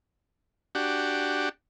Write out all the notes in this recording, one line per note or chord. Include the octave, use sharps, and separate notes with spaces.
D4 F#4 G4